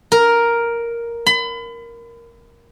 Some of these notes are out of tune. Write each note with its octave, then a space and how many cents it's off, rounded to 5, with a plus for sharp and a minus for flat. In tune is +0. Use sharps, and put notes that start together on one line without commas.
A#4 +5
B5 +35